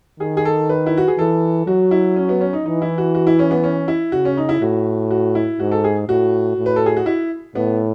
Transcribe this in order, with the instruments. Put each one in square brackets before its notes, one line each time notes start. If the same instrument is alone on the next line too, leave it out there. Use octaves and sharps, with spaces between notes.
[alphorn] D#3 [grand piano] G#4
[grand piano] G#4
A4
B4
E4
F#4
G#4
[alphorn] E3 [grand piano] A4
[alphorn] F#3 [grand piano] F#4
[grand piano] E4
C#4
B3
C#4
D#4
[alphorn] E3 [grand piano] D#4
[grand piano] E4
F#4
F#4
E4
C#4
B3
C#4
E4
[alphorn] C#3 [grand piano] F#4
[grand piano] C#4
D#4
E4
[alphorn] A2 [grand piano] F#4
[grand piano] F#4
E4
[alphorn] G#2 [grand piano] F#4
[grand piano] A4
G#4
[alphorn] A2 [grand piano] F#4
[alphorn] A2
[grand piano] B4
A4
G#4
F#4
E4
[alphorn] A2 [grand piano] B3